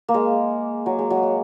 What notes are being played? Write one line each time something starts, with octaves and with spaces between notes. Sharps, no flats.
A#3
G#3
F#3
G#3
F#3
G#3